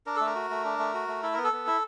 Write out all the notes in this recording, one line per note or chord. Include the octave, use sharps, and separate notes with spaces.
D4 A#4
A3 A4
A#4
F#4
A3
D4
A3
F#4
A3
E4 A4
B3 A#4
A4
B3
E4